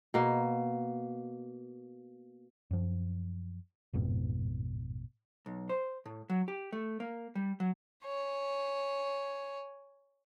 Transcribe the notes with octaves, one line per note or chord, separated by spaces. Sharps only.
B2 A#3
F#2 F3
A1 F2 G#2 B2
B1
C5
A2
F#3
G4
A3
A#3
G3
F#3
C#5 G#5